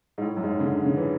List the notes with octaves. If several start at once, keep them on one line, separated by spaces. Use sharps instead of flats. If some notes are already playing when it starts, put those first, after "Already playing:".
G#2
A2
F#2
G#2
C#3
D3
C#3
E3